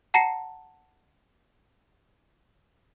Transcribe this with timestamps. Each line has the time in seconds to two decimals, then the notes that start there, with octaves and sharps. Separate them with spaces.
0.14 F#5 A5 A#5 A#6 C7 C#7